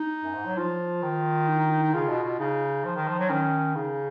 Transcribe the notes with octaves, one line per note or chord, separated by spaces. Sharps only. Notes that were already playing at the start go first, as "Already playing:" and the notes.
Already playing: D#4
F#2
G#2
F#3
F3 F4
D#3
D#4
D#4
D#4
D#4
C#3 F4
B2
B2
C#3 D#4
F3
D#3
F3
F#3
D#3 C#4
C#3 D#4